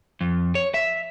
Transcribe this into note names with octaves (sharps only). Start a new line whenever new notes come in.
F2
C#5
E5